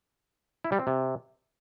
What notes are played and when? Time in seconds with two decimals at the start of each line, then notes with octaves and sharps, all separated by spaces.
0.64 E4
0.72 G3
0.79 C4
0.87 C3